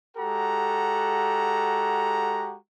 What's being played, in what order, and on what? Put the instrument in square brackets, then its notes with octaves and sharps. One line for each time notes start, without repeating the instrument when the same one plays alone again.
[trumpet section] G#3 F#4 G4 A4 F#5 A#5